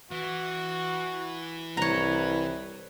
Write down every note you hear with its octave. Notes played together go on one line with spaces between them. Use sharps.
E3 F#4
C2 B4 C#5 A#5